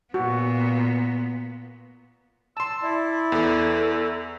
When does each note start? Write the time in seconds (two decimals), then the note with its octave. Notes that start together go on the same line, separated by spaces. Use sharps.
0.14 A#2 B3 F#4
2.57 A5 C6 E6
2.82 E4 D5
3.32 E2 A4